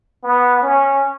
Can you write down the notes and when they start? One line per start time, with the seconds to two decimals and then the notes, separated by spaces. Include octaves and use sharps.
0.24 B3
0.62 C#4